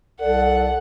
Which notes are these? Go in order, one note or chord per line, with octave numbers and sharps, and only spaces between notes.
C2 A4 D5 F#5